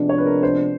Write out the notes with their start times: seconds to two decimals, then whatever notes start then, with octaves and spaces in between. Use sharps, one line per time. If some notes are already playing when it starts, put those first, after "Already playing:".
Already playing: C3 F3 G#3 B3 D4
0.09 C#5
0.18 B4
0.26 A#4
0.43 C5